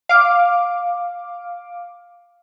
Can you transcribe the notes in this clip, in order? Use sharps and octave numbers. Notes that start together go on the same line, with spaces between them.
F5 D6